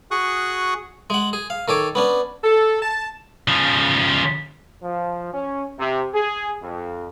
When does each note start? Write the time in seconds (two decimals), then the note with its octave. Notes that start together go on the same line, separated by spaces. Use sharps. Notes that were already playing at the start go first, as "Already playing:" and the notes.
0.11 F#4 G#4 C#6 D#6 F#6
1.10 G#3 F#5
1.33 G#4
1.50 F5
1.68 D#3 A4 C#5 D6
1.95 B3 C#4 D4
2.44 A4
2.83 A5
3.48 C#3 F3
4.82 F3
5.33 C#4
5.79 C3
6.14 G#4
6.61 F2